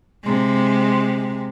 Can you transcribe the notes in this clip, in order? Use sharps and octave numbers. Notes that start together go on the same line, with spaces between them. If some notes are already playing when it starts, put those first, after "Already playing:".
C3 G#3